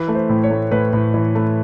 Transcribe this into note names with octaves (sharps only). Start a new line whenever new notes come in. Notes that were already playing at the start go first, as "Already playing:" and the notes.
Already playing: E3 B4
A3
C5
A2
C#5
A3
A2 B4
A2
E3
A3